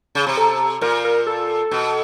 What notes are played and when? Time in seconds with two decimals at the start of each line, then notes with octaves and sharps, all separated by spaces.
0.15 C#3
0.27 C3
0.37 A4
0.81 A#2 A#4
1.05 A#4
1.27 A4
1.71 B2